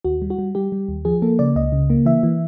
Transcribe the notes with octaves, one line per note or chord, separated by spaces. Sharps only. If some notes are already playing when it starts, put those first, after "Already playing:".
D#2 F#4
G3
F#4
G3
G3 G4
G3
D#2
F3 G#4
A#3 A4
C#3 D5
C#2 D#5
C#3
A#3
E3 E5
E3